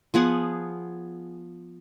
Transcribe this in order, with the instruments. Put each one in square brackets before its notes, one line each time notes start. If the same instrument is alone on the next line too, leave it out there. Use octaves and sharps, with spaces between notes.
[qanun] F3 B3 G#4 F#5